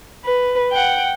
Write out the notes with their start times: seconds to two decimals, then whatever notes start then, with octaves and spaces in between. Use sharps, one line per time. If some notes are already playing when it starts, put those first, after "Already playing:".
0.25 B4
0.72 F#5 G5